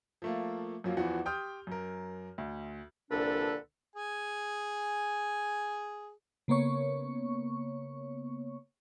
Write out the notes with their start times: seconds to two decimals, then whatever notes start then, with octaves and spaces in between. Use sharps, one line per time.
0.22 F3 A3 A#3
0.84 F#2 F3 F#3 A#3
0.97 E2 E3 F3 B3 F#4 F#5
1.26 G4 G5 C6 D#6 F6 G6
1.67 F#2 A#4
2.38 D2
3.11 C2 A#2 D3 D4 A4 B4
3.96 G#4 G#5
6.48 C#3 A#3 B3 C#5 C#6